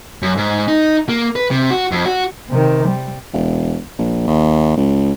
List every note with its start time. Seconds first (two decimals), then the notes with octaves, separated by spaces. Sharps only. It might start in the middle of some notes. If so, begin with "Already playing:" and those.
0.22 F#2
0.37 G#2
0.68 D#4
1.09 A#3
1.36 B4
1.51 C3
1.71 F#4
1.91 F2
2.06 F#4
2.50 C3 D#3
2.88 G3
3.33 E1
3.99 A#1
4.28 D#2
4.77 C#2